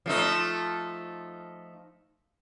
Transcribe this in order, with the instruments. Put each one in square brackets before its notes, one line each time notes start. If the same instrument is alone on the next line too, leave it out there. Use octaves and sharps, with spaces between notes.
[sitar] F3 A3 D#4